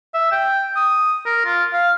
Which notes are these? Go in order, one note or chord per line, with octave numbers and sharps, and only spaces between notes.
E5
G5
D#6
A#4
F4
F5